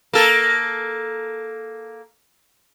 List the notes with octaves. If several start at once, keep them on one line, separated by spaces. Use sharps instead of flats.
A#3 A4